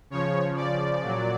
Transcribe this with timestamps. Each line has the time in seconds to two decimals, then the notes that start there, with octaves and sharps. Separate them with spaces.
0.10 C#3 F3 C#5
0.56 D5
1.03 A#2 F#3